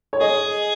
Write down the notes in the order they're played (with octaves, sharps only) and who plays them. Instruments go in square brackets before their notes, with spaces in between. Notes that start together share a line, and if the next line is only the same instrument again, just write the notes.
[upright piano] C#5
[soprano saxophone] G#4 [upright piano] D#5